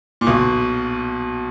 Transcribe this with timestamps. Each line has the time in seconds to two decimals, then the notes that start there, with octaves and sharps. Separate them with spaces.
0.21 A#2
0.27 B1 B2